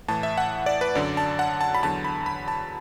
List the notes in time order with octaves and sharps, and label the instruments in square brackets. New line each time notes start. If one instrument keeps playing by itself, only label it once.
[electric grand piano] A2 E3 A5
E5
F#5
D5
B4
F#2 D3 F#3 D5
A5
F#5
A5
B5
E2 D3 F#3 A5
B5
B5
A5